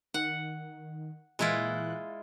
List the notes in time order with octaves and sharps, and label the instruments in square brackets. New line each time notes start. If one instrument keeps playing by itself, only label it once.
[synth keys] D#3 [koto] F#5
[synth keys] A#2 E3 F#6 [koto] G#3 E4 F4